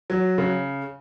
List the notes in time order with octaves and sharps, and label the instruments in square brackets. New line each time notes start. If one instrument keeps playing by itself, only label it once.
[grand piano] F#3
C#3